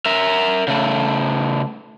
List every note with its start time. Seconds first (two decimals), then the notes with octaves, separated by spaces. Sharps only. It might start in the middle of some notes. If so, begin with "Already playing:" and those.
0.06 A#4 E5
0.68 C#3 A3